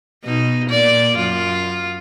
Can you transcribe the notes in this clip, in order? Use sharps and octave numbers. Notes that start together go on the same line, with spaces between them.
B2 D#4
A#2 D5
F#2 F4